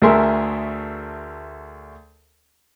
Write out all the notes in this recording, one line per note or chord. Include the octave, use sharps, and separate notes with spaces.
D2 A3 G#4 A#4 E5 C6